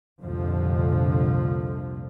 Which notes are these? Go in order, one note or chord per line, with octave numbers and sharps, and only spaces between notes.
C2 F2 A#2 D3 F3